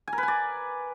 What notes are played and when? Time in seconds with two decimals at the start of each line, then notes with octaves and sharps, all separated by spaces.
0.08 G#5
0.13 A#4
0.18 B4
0.23 G#5
0.28 D5